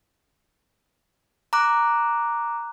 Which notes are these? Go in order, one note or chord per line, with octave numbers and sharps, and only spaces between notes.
A#5 D6 F#6